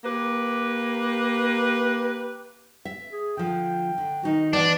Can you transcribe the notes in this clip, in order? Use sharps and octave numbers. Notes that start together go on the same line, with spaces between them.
A#3 G4 B4
E5
G#4
D3 F3 G5
D3
D#3 D#4 F#4
E3 B3 D4 B4 A5